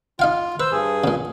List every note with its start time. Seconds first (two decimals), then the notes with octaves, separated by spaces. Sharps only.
0.19 D#4 F4 F5 G5
0.60 B4 C5 E6
0.72 G2 G#4
1.04 A#2 C#3